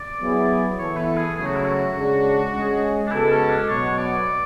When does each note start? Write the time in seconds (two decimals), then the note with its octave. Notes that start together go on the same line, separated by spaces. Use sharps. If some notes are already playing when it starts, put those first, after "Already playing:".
Already playing: D5
0.20 F#3 B3 E4 G#4
0.78 E3 B3 E4 A4 C#5
0.97 B4
1.17 G#4
1.36 C#3 F#3 A3 G#4
1.45 F#4
1.55 E4
1.64 F#4
1.94 C#3 G#3 D4
2.53 G#3 C#4 G#4
3.07 D4
3.10 C#3 G#3 B3 E4 F#4 A4
3.30 C#4
3.49 D4
3.69 B2 F#3 B3 F#4 C#5
3.98 D5